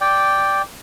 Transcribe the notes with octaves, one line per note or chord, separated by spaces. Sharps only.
D5 G5